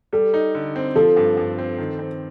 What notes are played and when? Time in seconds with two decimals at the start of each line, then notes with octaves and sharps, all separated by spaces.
0.13 G3 A4
0.34 D#4
0.55 D3
0.76 C4
0.95 F3 A4
1.17 G2
1.37 G2
1.59 C4
1.78 D#3
1.99 C4